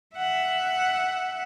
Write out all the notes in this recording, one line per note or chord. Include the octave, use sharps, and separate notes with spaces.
E5 F#5